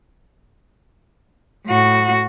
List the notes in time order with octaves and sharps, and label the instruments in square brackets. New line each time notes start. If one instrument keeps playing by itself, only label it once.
[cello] A2 F#4